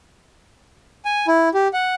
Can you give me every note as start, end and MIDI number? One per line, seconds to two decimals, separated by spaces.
1.05 1.26 80
1.27 1.49 64
1.54 1.68 67
1.73 1.95 78